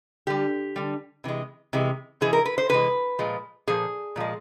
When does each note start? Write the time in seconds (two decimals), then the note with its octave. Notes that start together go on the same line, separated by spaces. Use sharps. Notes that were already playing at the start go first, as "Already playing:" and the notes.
0.27 D3 G3 G4
0.76 D3 G3
1.24 C3 E3 G#3
1.73 C3 E3 G#3
2.21 C3 E3 G#3 G#4
2.33 A#4
2.46 B4
2.58 C5
2.69 C3 E3 G#3 B4
3.19 A#2 F3 G#3
3.67 A#2 F3 G#4
4.16 A#2 F3 G#3